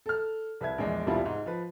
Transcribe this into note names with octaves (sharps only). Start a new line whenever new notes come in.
A4 F6
C2 B4 E5 G#6
A#1 E2 G#3
E1 C2 G3 B3 E4 F4
G#2
F3 B4